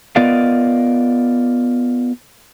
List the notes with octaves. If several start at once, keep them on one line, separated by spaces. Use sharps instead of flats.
B3 F4 A#4 D5 D#5 F5